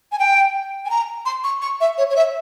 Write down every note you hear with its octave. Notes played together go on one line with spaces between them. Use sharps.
G#5
G5
G#5
A#5
C6
C#6
C#6
E5
C#5
C#5
E5